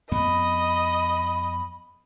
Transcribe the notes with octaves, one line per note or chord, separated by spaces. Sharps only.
F2 B3 D#5 B5